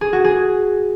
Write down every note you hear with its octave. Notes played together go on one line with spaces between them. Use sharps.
G#4
F#4
G#4